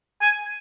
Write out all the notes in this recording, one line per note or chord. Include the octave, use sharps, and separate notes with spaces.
G#5